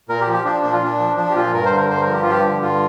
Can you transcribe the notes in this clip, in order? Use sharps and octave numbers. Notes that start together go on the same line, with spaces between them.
A#2 A#4
G4
F3
G4
F3 D4
A#2 D4
F4
A#2 D4
F3
F3 D4
G4
A#2 F4
G2 A#4
C5
D3
A#4
G2 C5
A#4
F3
G4
F4
G2 G4
D3
G2 F4